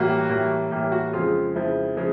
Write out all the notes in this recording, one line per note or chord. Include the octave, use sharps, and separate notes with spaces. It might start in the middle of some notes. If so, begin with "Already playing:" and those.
Already playing: A2 E3 G3 A#3 F#4
A2 E3 G3 A#3
A2 E3 G3 A#3 G4
F#4
F2 C#3 F3 G#3 F4
F2 C#3 F3 G#3 E4
C#3 F3 G#3